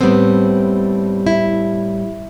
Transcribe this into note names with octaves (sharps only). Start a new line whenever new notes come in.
A2 G3 B3 C4
E4